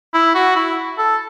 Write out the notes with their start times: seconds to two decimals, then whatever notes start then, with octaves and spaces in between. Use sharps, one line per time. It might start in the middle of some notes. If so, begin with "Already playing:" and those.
0.14 E4
0.35 F#4
0.56 E4
0.98 A4